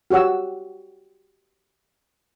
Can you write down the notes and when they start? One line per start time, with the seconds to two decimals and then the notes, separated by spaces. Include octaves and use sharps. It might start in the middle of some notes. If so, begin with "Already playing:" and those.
0.10 F#4 G4 C#5 F#5 E6